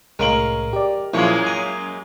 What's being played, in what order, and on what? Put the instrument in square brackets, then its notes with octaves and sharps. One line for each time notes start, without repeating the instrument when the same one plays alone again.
[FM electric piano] C2 A2 [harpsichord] G#3 C#4 F5 [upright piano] A#4 D7 F#7
[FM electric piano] G4 D5
[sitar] F#2 G#3 A#3 [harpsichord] A#2 F3 C#5 [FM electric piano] E4 F4
[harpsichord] G#5 A#5